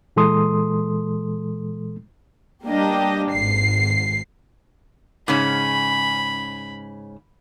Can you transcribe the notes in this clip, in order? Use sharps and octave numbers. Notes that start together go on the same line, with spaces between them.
A#2 E3 G#3 A4 C6 D#6
G3 A#3 D4 G4 D#5
G#1 C7
G#2 C#3 C#4 B5